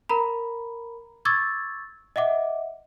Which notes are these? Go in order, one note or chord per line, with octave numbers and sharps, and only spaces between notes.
A#4 A#5 B5
C#6 D6 E6 G#6 A6
D#5 E5 F#5 D6